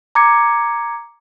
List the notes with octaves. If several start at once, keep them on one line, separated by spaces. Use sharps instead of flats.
A#5 D6 G#6 C#7